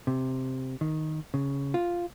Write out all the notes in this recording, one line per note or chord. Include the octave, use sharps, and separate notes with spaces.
C3
D#3
C#3
F4